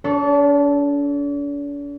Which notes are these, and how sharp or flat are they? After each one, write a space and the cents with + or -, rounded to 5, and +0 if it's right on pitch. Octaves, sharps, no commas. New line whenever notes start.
D4 -45 A4 -15 C#5 +0